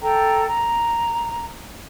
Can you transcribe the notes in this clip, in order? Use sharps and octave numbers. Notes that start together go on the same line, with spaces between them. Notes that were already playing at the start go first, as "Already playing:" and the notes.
A4 G5 A#5
A#5